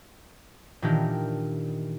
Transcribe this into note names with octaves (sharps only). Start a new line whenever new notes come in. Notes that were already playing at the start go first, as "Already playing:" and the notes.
A#2 D#3 E3 D4 G4 A#4